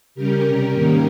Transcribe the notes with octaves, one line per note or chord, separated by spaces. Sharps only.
C#3 G3 C#4 G4 A#4
C3 G3 C#4 G4 A#4
G#2 D#3 A#3 C#4